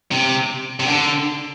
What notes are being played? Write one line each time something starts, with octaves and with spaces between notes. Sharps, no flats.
C3
C3
D3